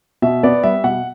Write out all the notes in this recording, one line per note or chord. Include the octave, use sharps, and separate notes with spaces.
B2 E5
B3 D5
G3 E5
B2 F#5